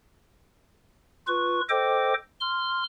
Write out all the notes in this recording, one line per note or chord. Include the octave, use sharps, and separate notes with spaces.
F4 B4 C#6
A4 C5 D#5 G5 D6
C6 F6